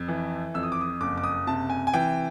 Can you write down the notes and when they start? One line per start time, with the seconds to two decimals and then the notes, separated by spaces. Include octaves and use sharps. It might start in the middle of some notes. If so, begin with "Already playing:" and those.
Already playing: F2
0.08 E3
0.54 F2 E6
0.63 D#6
0.72 D6
0.81 D#6
1.01 F#1 D6
1.18 D6
1.24 D#6
1.47 C3 A5
1.70 G#5
1.87 G#5
1.94 E3 G5